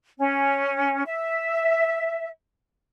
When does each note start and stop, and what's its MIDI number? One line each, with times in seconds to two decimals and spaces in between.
0.19 1.03 61
1.05 2.28 76